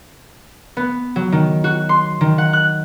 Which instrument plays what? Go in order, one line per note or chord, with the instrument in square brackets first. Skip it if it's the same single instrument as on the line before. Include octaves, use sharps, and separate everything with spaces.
[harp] B3
F#3
D#3
F#4
C6
D#3
F#5
F#6